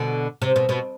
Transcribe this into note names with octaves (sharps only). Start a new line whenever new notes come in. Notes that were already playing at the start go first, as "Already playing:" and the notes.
Already playing: B2 D3
C3
B2
B2